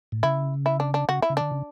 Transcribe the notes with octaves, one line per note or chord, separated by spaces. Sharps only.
A2
C#3 E4
E4
D4
D4
C#3 F#4
E4
C#3
D3 D4
C#3